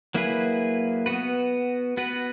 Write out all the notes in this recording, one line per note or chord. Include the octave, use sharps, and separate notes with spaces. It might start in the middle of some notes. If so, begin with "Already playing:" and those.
F#3 A#3 E4 G#4 B4
B3 F#4 B4
B3 F#4 B4